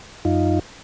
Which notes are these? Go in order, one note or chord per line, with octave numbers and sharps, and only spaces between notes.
F#2 D#4 F4